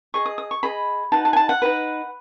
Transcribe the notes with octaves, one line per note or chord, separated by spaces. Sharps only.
G#4 D#5 C#6
D#6
D#6
C#6
G#4 D#5 B5
D#4 F#4 B4 A5
A5
G#5
A5
F#5
D#4 F#4 B4